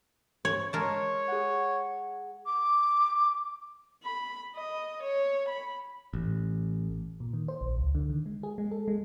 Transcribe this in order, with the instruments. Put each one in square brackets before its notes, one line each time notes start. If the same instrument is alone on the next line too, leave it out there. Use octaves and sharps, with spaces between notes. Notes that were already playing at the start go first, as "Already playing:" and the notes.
[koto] C#5
[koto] G#3 A#4 A5 [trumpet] C#5
[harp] G#4 F#5
[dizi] D6
[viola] B5
D#5
C#5
B5
[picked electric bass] A1
[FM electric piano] A#2
D#3
C5
A#1
C#2
D3
D#3
G#3
G#4
G#3
A4
G#3